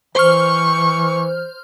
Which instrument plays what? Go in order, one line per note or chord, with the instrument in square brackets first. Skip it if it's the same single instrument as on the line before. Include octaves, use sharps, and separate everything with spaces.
[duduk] E3 [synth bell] C5 F6 [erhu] C#6